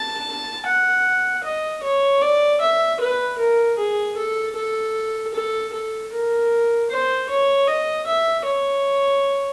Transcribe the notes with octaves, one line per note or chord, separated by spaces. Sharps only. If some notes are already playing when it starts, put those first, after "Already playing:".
Already playing: A5
F#5
D#5
C#5
D5
E5
B4
A#4
G#4
A4
A4
A4
A4
A#4
C5
C#5
D#5
E5
C#5